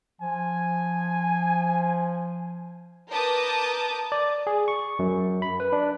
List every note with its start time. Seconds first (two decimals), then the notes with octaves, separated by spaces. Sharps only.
0.21 F3 G#5
3.11 A#4 B4 A5 D6 D#6 G6
4.12 D5
4.47 G#4
4.68 C#6
4.99 F#2
5.42 B5
5.60 B4
5.73 D4